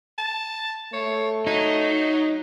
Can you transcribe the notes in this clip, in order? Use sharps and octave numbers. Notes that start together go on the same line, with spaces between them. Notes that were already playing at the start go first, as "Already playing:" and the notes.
A5
A3 C#5
F#3 D#4